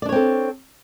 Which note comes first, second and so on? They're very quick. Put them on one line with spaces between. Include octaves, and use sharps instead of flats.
D5 D4 C#5 C4 A4